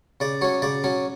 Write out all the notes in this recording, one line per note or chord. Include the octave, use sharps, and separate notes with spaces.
C#3 D5
F#3 C#4 C#5
C#3 D5
F#3 C#4